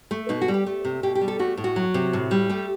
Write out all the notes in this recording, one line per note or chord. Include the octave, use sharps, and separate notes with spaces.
A3
B2 D#4
F#4
G3
G4
A3
C3
B2 G4
G4
G3
A4
A3 F#4
A2
F#4
F#3
C3
A2
G3
A3 G4